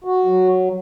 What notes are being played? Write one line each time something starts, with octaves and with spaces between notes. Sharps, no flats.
F#4
F#3